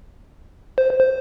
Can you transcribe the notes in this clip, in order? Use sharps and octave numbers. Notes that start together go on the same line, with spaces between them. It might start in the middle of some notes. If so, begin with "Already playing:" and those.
C5
C5